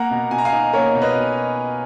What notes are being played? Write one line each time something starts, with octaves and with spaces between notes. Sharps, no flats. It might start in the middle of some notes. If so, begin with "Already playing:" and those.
Already playing: A#3 F#5 A#5
B2
B2 G#5
A#5
F5 G#5
D#4
A#3 A#4 C#5
B2
B4 D#5
B2